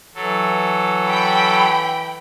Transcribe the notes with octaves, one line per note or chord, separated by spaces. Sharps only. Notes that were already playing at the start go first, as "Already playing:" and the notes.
E3 F#3 A4
G5 B5